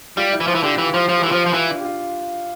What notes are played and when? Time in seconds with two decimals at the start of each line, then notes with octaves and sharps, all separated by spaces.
0.17 G3 F4
0.33 E4
0.40 E3
0.47 F3 F4
0.55 E3
0.63 D3 G4
0.78 E3
0.86 F4
0.94 F3
1.09 F3 F4
1.17 G4
1.23 E3 F4
1.32 F3
1.46 F3
1.53 E3 F4
1.70 D4
1.80 G4
1.85 F4